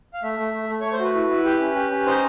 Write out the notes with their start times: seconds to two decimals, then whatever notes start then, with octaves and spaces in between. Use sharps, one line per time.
0.14 F5
0.23 A3 E5
0.38 A3
0.53 A3
0.69 A3
0.81 A3 C#5
0.92 C5
0.99 F#4 B4
1.14 E4
1.30 E4
1.45 G4
1.60 C#4
1.76 G4
1.91 C#4
2.06 D#4 C5